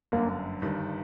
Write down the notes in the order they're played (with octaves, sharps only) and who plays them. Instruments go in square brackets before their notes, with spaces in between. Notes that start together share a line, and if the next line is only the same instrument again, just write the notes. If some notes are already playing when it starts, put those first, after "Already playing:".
[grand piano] G1 F#2 D3 [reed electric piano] A#3
[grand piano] G1 G2 D#3